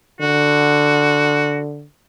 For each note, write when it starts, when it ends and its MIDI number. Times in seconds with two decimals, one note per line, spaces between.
0.20 1.86 50
0.20 1.63 66